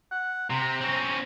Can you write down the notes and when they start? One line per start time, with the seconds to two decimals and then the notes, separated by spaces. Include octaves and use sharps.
0.11 F#5
0.50 C3 A#5
0.81 C4 C#4